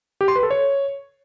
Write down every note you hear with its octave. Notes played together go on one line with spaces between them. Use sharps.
G4
C6
B4
A4
C#5